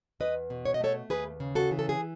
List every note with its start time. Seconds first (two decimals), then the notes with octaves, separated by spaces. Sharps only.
0.20 E2 B4 D#5
0.50 B2
0.65 C#5
0.74 D#5
0.80 A3 A4 C#5
1.10 D#2 G#4 B4
1.40 C#3
1.55 F#4 A4
1.71 E3
1.79 A4
1.89 G#4